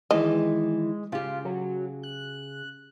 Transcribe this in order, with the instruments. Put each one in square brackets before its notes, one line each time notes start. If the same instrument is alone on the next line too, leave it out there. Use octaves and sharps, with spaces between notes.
[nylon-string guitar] D#3 E3 D5 [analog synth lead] G#3 [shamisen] D#5
[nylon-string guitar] C#3 G4 [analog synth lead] F4
[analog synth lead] F#3
F#6